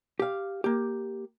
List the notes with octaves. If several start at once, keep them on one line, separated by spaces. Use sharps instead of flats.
G4 F5
A#3 G4